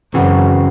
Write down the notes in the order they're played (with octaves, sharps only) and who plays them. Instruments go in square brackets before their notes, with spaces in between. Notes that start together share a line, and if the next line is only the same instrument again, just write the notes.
[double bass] F#2 [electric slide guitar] C#3 E3 C4 F#4